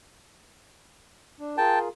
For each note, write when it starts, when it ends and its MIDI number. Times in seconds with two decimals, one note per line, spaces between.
1.39 1.57 62
1.58 1.88 65
1.58 1.88 68
1.58 1.88 70
1.58 1.79 79
1.58 1.79 81